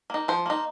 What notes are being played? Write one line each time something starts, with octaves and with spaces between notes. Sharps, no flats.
A#3 D#4
F3 C5
A#3 D#4